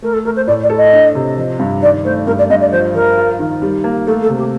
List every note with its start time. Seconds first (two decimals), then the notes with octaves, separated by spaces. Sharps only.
0.02 A3 A#4
0.13 A4
0.25 A3 A#4
0.36 C5
0.47 A2 D5
0.63 D5
0.70 A4
0.77 D#5
0.93 D4
1.15 C3
1.37 F3
1.59 G2
1.82 D#3 D5
2.05 A3 C5
2.27 G2 A#4
2.38 D5
2.50 G2 D#5
2.61 D5
2.72 F3 C5
2.95 F3 A#4
3.17 F4
3.39 D#3
3.62 G3
3.84 A#3
4.07 A3 A4
4.22 A4
4.29 C3
4.37 G4